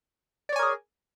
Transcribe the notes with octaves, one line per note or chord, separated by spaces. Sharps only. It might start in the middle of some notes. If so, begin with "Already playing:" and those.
G#4 A#4 C#5 D5 G#5